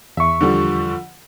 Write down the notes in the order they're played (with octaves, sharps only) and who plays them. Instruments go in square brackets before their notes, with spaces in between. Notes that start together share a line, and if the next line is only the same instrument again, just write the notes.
[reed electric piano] E2 C#6 [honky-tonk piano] E5
[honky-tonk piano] D3 F3 G3